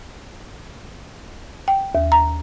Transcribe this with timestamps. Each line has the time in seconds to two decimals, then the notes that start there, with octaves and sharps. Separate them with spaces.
1.68 G5
1.95 D#2
2.12 A#5